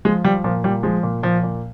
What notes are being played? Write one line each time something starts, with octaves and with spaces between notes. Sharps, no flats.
F3 G#3
F3 G3
A#2 F3
A#2 G3
F3 G#3
A#2
A#2 F3
A#2